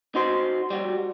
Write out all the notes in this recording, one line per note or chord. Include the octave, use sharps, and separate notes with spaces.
D#4 F#4 C5
G3 F#4